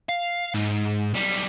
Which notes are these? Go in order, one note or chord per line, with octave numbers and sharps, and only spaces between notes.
F5
G#2
B1 G3